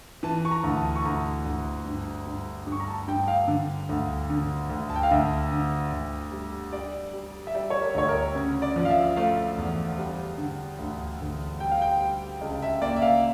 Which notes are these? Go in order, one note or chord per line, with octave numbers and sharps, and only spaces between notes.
E3 A5
C#6
A#5
D2
A5
C#6
D2 A#5
D2
G2
G2
G2
C#6
A#5
A5
G2 G5
F5
D3
D2
D3
D2
A5
G5
F5
D2 E5
D3
D2
G3
G3 D5
G3
E5
G3 D5
C#5
A#4
D2 C#5
A#4
C#3
D5
F3
F5
E5
A3 F5
E2
G3
D3
D2
D2
G3 G5
F5
G5
G3
C#2
E5
A#3 D5
E5
F5